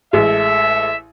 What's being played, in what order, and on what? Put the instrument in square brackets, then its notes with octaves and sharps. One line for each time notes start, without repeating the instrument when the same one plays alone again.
[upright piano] A1 G#3 [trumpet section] A4 E5